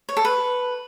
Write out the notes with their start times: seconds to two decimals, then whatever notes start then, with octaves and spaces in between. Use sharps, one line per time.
0.09 C#5
0.17 A4
0.25 B4